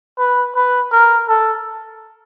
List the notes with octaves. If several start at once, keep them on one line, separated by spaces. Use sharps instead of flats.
B4
B4
A#4
A4